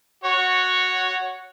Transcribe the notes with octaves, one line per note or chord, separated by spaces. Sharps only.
F#4 C#5